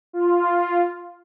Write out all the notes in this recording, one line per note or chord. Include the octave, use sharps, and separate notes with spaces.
F4